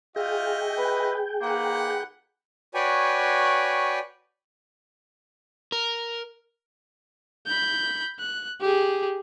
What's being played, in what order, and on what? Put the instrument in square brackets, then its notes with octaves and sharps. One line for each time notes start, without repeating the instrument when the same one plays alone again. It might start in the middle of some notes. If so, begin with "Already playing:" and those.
[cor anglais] F4 [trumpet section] F#4 D#5 E5 [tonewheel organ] G#4 G5
[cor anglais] B4
[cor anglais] A#3 [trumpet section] D#4 B4 F#5
[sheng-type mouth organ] F#4 B4 C#5 D5 G5 G#5
[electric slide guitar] A#4
[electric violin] B5 G6
F#6
G4 G#4